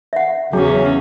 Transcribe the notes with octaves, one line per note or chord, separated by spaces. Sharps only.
E5 F#5
E2 C#3 F#3 C#4 G#4 D6